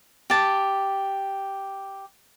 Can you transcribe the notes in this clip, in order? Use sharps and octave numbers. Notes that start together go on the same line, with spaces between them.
G4 A5